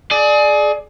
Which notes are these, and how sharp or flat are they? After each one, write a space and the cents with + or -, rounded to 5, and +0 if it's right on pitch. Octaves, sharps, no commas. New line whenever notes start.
G#4 +30 D5 +20